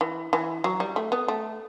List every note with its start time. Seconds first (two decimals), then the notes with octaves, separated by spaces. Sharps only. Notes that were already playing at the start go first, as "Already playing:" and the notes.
0.01 E3
0.33 E3
0.64 F#3
0.80 G3
0.96 A3
1.12 B3
1.28 A3